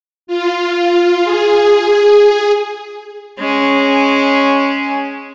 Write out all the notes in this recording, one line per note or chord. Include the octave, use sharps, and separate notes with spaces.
F4
G#4
G#3 C#4